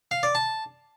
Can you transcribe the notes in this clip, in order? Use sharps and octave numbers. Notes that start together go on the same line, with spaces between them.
F5
D5
A5